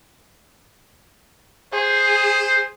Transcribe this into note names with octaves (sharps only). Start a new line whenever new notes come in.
G#4 C5